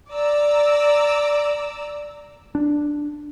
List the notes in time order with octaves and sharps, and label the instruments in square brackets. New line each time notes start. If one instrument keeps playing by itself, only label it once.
[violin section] D5 A#5 E6
[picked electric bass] D4